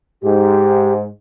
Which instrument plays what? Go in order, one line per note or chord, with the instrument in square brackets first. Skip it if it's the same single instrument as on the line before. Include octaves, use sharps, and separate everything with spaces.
[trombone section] G#2 [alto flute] G4